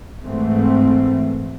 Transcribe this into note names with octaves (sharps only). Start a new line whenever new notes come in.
G#2 E3 A3 C4